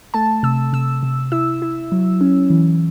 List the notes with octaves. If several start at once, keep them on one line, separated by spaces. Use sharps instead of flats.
A3 A5
C3 E6
C3 E6
C3
E4 E6
E4
F#3
C#4
E3